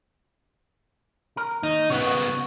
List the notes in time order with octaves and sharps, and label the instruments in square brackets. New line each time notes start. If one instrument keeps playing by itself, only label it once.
[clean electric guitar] A#4
[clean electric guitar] D#2 [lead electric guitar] D#4
[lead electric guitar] C#3 B3 [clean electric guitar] F#4